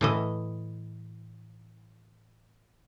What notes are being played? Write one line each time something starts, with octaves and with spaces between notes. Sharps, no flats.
A2 E3 D#5